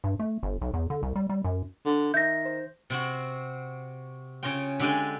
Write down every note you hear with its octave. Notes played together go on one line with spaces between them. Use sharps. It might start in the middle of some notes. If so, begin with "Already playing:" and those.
G2
A3
G1
B1
E2
D3
C2
G3
G3
F#2
D3
D#3 E5 G6 A#6
C5
C3 C4 F#4
C#3 C#4 F4 G5
D3 G#3 G4 A4 G5 G#5